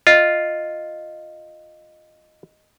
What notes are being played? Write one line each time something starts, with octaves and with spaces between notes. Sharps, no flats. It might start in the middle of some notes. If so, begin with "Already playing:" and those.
F4 D#5